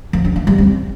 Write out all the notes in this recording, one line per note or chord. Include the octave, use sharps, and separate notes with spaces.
F3
D4
E3
G3
C4